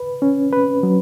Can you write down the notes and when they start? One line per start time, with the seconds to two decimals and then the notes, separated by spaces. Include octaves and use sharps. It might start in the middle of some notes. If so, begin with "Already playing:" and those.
Already playing: B4
0.22 C#4
0.53 B4
0.83 F#3